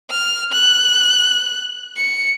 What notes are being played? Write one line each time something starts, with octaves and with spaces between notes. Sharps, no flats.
F6
F#6
C#7